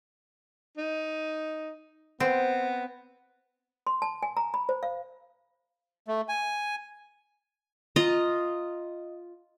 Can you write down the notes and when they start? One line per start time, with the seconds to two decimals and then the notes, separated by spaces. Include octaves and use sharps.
0.77 D#4
2.20 B3 C4
3.87 C6
4.02 A5
4.23 G#5
4.37 A#5
4.54 B5
4.69 C5
4.83 F5
6.08 A3
6.29 G#5
7.96 F4 D#5 A#5